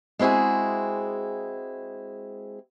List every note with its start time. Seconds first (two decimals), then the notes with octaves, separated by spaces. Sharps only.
0.19 G#3 C4 E4 F#4 G#4